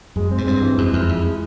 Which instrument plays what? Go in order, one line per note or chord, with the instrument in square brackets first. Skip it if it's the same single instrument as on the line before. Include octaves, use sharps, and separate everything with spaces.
[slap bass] F#2 [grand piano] G#3
[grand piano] C4
[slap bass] G#2
[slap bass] G2 [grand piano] C4
[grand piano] E3
[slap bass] F#2 [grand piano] G#3
[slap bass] F2 [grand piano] E4
[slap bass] F2 [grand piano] E4
[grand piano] G#3